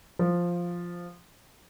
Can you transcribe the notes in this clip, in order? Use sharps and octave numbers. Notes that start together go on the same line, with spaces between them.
F3